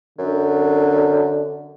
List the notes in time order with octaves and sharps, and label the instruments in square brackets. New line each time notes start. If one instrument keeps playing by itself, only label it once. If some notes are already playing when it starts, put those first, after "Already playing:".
[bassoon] F#2 [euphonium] D3